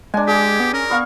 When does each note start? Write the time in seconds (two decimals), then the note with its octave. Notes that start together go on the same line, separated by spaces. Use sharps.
0.14 G#3 D4 G#5
0.28 G4 G#4
0.60 B3
0.73 C#4 A#4
0.90 B3 F5 C#6